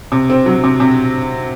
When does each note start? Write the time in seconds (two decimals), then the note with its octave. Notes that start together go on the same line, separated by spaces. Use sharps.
0.12 C3
0.30 C4
0.46 F#3
0.64 C3
0.80 C3